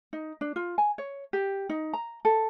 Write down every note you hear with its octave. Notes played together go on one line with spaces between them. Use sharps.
D#4
D4
F4
G#5
C#5
G4
D#4
A#5
A4